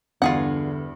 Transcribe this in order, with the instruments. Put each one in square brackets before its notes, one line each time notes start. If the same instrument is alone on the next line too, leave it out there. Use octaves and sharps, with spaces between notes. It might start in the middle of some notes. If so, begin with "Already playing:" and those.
[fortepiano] E2 G2 [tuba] D3 [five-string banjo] F4 G#4 F#5